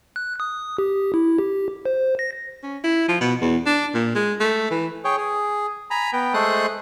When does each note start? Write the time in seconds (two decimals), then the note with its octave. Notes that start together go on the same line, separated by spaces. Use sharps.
0.16 F#6
0.40 D#6
0.78 G4
1.14 E4
1.38 G4
1.86 C5
2.19 A#6
2.63 C#4
2.84 E4
3.08 F3
3.21 B2
3.41 E2
3.66 D4
3.94 A#2
4.15 G#3
4.40 A3
4.71 E3
5.05 G#4 C#5 G5
5.17 G#4
5.91 G#5 A#5 B5
6.13 B3 G5
6.34 G#3 A3 A4 C5 D#6 F#6